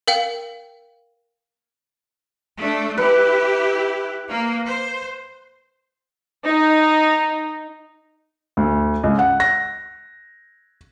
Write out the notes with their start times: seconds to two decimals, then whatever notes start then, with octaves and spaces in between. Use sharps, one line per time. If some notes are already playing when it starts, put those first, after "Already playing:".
0.08 A#4 F5 G5
2.57 A3 D4
2.98 E4 G4 B4
4.29 A#3
4.66 C5
6.48 D#4
8.57 D2
9.04 C#2
9.19 F#5
9.40 A#6